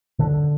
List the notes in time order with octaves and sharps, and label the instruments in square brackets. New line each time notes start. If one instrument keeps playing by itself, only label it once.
[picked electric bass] D3